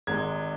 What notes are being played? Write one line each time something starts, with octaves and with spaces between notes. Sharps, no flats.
G#1 G#2 G#3 G#6